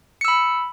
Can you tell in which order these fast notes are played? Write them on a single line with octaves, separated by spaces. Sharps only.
C#7 E6 B5